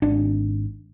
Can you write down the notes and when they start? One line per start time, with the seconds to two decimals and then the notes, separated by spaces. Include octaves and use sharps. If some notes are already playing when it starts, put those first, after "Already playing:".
0.02 G#1 D4